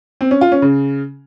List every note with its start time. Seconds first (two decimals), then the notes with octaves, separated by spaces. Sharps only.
0.21 C4
0.31 C#4
0.41 F4
0.52 C#4
0.62 C#3